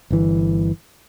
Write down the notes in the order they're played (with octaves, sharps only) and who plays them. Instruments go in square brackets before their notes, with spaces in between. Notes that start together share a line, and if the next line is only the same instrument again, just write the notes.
[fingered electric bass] G1 E3